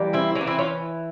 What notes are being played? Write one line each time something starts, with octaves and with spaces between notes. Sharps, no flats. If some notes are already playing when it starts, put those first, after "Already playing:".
Already playing: E3 G3 A#3
C4 E4
E3 C#4
A#3
C4 E4
C#4 F4